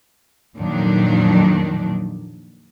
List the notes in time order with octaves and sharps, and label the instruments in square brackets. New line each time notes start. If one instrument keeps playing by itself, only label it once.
[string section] F2 A#2 D#3 F#3 D4